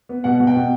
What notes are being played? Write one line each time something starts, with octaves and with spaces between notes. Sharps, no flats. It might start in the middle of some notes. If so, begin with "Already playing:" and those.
B3
B2 F#5
B2
G5
B2